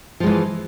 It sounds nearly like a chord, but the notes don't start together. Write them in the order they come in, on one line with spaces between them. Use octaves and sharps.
F3 G#3 E3